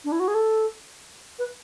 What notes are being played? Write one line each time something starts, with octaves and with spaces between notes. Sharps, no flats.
D4
E4
F#4
G#4
A4
B4